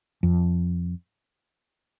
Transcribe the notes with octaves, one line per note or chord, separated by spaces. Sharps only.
F2